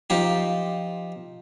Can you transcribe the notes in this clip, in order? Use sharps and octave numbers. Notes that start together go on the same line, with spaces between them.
F3 D#4 G4